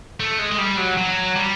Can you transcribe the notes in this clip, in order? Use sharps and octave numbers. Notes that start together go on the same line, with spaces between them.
A3
G#3
G#3
G3
F#3
F#3
G3